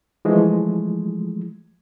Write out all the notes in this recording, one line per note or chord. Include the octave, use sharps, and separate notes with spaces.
E3 F3 G#3 A3